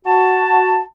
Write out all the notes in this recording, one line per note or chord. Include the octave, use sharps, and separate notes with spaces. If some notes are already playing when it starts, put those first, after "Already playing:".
F#4 A5